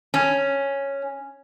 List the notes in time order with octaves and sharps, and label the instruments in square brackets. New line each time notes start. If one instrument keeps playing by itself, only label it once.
[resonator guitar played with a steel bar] C#4